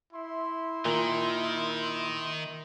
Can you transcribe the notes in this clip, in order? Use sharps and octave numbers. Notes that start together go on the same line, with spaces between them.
E4 E5 C6
A#2 D#3